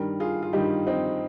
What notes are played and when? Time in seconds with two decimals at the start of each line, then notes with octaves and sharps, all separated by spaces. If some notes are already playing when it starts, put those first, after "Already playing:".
Already playing: G2 D#3 G3 A#4
0.20 F4 G#4
0.43 F4
0.53 G2 D#3 G3 D#4 G4
0.87 C4 D#4